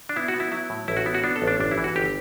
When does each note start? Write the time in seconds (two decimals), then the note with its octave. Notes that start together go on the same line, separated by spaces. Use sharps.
0.09 D4
0.16 B3 E4
0.28 F#4
0.34 B3
0.40 E4
0.52 F#3 E4
0.70 A2
0.88 A1 E4
0.97 F#4
1.06 B3 E4
1.15 F#4
1.24 B3 D4
1.36 A4
1.42 A1
1.47 D4
1.60 G1 D4
1.71 E4
1.77 E3
1.84 F#4
1.96 G1 G4